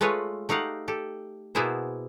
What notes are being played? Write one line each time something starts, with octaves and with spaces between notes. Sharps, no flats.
G#3 A3 F4 B4 C#5
A3 D#4 G4 F5 F#5
G4 A4
B2 A#3 B3 E4 G#4 C5